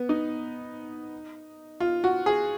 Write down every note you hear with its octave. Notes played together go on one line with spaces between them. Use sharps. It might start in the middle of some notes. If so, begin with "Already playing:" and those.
Already playing: B3
D#4
F4
F#4
G#4